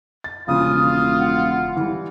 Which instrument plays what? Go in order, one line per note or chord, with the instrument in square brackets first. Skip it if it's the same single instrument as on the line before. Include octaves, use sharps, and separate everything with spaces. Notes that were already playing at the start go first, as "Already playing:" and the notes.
[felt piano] A6
[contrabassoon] E1 [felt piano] A#2 C#3 F3 [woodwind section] F4 [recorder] D#6
[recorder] D#6
F#5
[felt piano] E3 G3